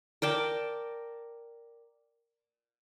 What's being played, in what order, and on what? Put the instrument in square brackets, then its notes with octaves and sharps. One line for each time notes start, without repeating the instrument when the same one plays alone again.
[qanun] A#4 D5 G5 A5